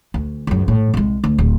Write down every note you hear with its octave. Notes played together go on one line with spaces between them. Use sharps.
D2
C#2 F#2
A2
C2 G#3
D2
D1